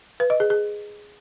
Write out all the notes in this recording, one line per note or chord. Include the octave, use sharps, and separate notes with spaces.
B4
D#5
G#4
G#4